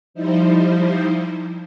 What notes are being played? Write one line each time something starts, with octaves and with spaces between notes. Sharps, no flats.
F3 G3 D#4 E4 C5